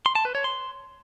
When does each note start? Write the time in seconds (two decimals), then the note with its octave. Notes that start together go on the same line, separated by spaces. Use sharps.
0.06 C6
0.15 A5
0.25 B4
0.35 C#5
0.44 C6